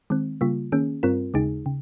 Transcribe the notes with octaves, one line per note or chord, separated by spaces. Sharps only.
D#3 G#3 C4
C#3 G3 A#3 F4
D#3 A#3 C#4 G#4
G2 G3 C4 F4 A#4
D#2 C#3 G#3 D#4 G#4
C#3